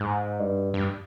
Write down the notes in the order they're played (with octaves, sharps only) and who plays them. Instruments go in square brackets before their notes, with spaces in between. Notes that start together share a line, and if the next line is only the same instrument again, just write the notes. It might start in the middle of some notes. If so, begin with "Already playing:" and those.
Already playing: [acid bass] G#2
G2
G2